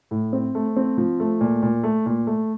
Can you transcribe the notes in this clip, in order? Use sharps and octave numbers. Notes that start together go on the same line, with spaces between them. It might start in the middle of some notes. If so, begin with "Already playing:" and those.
A2
C4
A3
C4
F3
A3
A#2
A#2
A3
A#2
A3